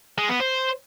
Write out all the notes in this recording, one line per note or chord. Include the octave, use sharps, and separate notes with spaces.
G#3
B3
C5